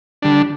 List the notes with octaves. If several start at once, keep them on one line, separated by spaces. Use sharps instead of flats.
D3 G3 D4